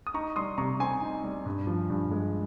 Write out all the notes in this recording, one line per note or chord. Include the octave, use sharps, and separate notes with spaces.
D#6
D#4 A#5 C#6
G3 C6 D#6
C3 A#5 C#6
C4 G#5 C6
D#4
G3
G2
F3
G2
G#3